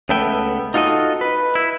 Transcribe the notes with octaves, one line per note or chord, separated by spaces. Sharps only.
C#2 C#3 A3 B3 E5 G5
D#4 F4 F#4 A4 D#5
B4
E4